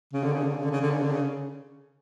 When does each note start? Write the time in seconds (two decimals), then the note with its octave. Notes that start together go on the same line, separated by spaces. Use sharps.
0.13 C#3
0.23 D3
0.33 C#3
0.43 D3
0.52 C#3
0.63 D3
0.72 C#3
0.81 D3
0.91 C#3
1.02 D3
1.11 C#3